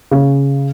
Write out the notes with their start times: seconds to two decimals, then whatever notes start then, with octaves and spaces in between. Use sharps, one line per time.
0.11 C#3